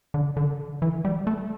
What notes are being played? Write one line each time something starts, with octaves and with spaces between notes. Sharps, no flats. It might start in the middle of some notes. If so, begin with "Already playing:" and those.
D3
D3
E3
G3
A3